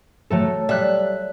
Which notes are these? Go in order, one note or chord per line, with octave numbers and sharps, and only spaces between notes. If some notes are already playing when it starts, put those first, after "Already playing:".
F#3 A3 A4
G3 E5 F#6